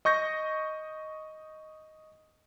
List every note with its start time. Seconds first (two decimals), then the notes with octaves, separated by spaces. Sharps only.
0.05 D#5 C#6 G6 A#6